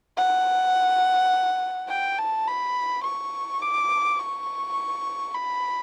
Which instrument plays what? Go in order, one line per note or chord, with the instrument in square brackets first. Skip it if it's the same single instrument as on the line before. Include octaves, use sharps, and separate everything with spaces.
[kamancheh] F#5
G5
A5
B5
C#6
D6
C#6
B5